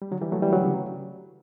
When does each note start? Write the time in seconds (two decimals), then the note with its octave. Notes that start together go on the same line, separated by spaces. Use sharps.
0.02 G3
0.11 D3 F#3
0.21 E3 G3
0.32 F#3 A3
0.42 E3 G3
0.52 D3 F#3
0.63 C#3